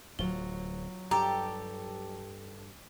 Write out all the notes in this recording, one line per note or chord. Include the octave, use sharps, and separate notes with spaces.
D1 F#3 F4 G7
G2 G4 A4 A#5